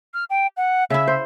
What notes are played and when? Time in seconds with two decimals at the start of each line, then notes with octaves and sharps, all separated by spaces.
0.14 F6
0.30 G5
0.57 F#5
0.90 C#3 E4 E5
1.07 C5